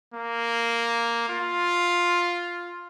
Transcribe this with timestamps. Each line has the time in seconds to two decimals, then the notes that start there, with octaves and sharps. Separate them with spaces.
0.14 A#3
1.29 F4